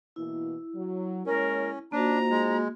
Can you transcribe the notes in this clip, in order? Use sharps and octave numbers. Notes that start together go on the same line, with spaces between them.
B2 E3 A#3 E4
F#3
G#3 A#3 C#4 A#4 C#5
A#3 D4 D#4 F4 F#4 C5 A#5
G#3